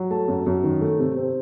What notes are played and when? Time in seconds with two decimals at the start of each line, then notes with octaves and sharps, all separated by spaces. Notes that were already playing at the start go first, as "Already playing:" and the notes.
Already playing: F#3
0.11 A3 A5
0.28 F#2
0.46 F#2
0.64 D#3
0.82 A3
0.99 C3
1.17 C4